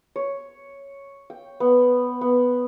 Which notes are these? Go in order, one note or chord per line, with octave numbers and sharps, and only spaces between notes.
C#5
G5
B3
B3